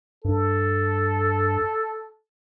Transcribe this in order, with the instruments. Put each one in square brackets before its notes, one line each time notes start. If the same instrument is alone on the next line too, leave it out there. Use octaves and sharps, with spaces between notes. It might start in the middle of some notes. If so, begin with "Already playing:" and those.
[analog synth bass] G2 [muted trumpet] A4